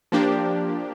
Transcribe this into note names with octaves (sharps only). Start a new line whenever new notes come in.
F3 A#3 D4 G4